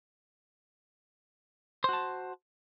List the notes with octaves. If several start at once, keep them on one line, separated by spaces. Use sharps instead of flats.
F#4 C5 A5